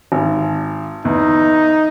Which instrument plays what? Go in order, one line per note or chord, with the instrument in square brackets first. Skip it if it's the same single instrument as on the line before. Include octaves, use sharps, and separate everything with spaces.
[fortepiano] G#1
[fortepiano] E2 [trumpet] D#4